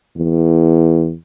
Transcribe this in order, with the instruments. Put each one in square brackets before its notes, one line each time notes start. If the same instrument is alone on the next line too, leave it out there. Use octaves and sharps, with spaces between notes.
[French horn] E2